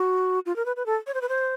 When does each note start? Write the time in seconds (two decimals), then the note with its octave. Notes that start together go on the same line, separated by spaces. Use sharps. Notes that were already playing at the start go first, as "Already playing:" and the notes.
Already playing: F#4
0.46 F4
0.56 A#4
0.66 B4
0.76 B4
0.86 A4
1.07 C#5
1.14 C5
1.22 B4
1.29 C5